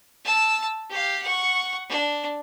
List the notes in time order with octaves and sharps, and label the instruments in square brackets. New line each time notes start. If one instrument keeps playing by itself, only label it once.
[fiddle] A5 E6
G4 F5
F#5 C#6
D4